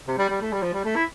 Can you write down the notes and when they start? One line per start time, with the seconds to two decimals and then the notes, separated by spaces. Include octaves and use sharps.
0.08 C3
0.18 G3
0.29 G3
0.41 A3
0.52 G3
0.62 F3
0.74 G3
0.85 A3
0.96 E4